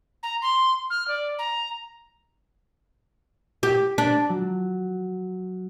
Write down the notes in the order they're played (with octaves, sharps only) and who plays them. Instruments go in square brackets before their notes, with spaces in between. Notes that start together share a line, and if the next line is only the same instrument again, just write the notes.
[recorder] A#5
C6
F6
D5
A#5
[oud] G4
D4
[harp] F#3